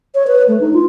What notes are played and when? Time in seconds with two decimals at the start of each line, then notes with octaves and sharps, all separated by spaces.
0.15 C#5
0.27 B4
0.48 A3
0.61 D#4
0.74 F4